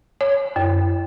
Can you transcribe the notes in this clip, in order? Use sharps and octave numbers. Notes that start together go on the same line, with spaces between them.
C#5
F#2